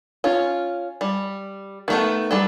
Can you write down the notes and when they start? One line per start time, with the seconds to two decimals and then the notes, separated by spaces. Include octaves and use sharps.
0.24 C#4 F4
1.01 G3
1.88 D#3 A3 B3
2.31 F#3 G3 A4